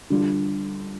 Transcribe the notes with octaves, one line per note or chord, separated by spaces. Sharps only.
D3 G3 D4 F4